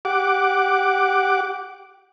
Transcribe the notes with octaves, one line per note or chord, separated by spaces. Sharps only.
G4 F#5 D6